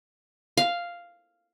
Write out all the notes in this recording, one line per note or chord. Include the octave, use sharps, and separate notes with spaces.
F5